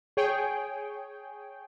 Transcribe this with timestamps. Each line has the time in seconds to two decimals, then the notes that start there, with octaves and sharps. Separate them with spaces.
0.17 G#4 C#5 G5